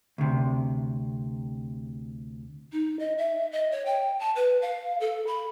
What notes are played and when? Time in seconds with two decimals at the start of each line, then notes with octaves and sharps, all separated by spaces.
0.18 D2 C3
2.72 D#4
2.99 D#5
3.18 E5
3.52 D#5
3.71 C#5
3.86 G5
4.20 A5
4.36 B4
4.62 F5
5.00 A4
5.27 B5